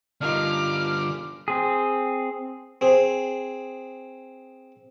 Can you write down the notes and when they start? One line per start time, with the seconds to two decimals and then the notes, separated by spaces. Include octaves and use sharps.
0.21 D3 G3 D4 D#4 F4 A#4 D6 F6
1.48 C4 G#4
2.81 C4 G#4